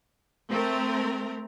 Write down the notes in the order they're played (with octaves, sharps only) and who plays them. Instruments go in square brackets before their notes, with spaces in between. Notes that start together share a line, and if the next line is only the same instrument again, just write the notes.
[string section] A3 C4 A#4